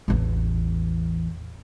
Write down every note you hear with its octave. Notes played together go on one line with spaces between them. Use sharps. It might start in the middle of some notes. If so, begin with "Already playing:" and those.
A1 E2